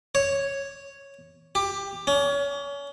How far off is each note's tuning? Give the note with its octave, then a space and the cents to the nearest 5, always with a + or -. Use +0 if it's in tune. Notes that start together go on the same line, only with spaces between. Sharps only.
C#5 -5
G4 +15
C#4 +30